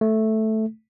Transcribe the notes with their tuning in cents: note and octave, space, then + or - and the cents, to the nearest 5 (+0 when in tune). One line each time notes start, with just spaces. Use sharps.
A3 -5